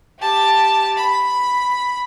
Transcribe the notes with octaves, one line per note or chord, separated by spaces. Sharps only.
G4 A5
B5